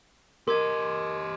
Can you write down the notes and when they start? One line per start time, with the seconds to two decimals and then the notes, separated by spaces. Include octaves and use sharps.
0.48 G4 A#4 D#5 C6 D6 G#6